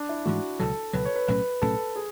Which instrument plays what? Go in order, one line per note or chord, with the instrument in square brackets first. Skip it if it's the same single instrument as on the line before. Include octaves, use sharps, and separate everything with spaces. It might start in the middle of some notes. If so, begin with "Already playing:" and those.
Already playing: [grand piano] D4
E4
[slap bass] G#2 E3 A3 [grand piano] F#4
[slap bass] C#2 B2 F#3 [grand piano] A4
[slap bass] C#2 B2 F#3 [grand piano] B4
[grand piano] C#5
B4
[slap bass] B1 A2 F#3 C#4 [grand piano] B4
[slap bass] B1 A2 F#3 C#4 [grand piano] A4
[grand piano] G#4